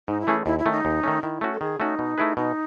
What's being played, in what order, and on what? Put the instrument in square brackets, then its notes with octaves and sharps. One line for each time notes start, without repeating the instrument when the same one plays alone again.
[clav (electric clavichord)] G#2 [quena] D#4
[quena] E4
[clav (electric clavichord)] E3 A3 C#4 G#4
[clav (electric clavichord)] D#2 [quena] E4
[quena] E4
[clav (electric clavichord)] D#3 A3 C#4
[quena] D#4
[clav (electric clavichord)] D#2
D#3 A3 C#4
[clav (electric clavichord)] D#3 [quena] E4
[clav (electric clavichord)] A3 C#4 F#4
[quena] A4
[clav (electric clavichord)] D#3 [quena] G#4
[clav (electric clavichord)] A3 C#4 F#4 [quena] D#4
[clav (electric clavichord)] B2
A3 E4 G#4 B4
[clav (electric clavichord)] B2 [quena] D#4